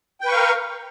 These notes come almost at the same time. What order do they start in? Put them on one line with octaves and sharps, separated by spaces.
G5 B4 C#6 F5 A#4